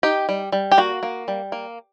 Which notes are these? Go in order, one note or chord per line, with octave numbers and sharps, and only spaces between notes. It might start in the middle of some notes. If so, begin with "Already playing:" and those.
D#4 G4
G3
G3
G4
A#3 F#4
A#3
G3
A#3